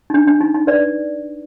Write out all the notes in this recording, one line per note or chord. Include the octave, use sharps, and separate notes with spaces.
D#4
D4
D4
D#4
D#4
B4 D5